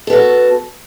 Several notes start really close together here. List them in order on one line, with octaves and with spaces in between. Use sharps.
A4 B3 F#4